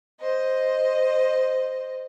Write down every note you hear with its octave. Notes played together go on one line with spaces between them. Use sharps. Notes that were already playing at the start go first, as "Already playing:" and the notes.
C5 D#5